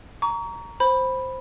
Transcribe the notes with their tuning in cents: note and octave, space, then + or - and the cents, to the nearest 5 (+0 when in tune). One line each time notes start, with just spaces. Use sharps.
A#5 +0 C#6 +35
C5 +0 B5 +0